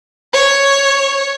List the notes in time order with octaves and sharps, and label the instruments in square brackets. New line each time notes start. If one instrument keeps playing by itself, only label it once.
[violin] C#5